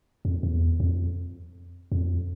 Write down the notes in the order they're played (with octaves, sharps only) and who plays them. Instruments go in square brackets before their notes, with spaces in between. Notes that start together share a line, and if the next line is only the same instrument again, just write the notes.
[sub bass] F2
E2
F2
F2